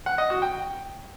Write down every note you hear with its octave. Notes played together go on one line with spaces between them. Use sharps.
F#5
D#5
F#4
G5